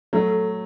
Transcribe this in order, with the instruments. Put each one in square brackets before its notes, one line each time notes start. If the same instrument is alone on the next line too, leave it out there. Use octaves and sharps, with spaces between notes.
[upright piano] F#3 A3